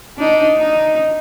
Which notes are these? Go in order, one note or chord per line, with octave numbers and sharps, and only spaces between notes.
D4 D#4
D#4